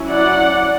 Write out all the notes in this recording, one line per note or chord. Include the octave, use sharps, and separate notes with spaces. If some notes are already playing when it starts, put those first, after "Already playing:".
Already playing: F#3 C#4 E4
D5 F#5